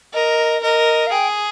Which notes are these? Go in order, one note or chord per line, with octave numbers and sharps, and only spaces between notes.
A#4 D#5
A#4 D#5
F5
G#4 G5